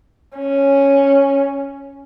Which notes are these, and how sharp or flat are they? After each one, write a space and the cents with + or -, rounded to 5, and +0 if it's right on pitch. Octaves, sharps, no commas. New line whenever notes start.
C#4 -5